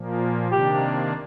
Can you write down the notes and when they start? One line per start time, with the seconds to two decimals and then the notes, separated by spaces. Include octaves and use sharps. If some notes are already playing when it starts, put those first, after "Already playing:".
Already playing: A#2 F3 A#3
0.51 C3 D#3 A#3 D4 G4